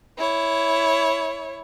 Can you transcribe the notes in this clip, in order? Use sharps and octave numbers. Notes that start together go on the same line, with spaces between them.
E4 C#5